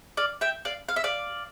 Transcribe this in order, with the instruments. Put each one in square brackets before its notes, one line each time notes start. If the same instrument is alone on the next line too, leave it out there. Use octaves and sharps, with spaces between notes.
[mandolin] D5 F5
E5 G5
D5 F5
F5
E5
D5 F5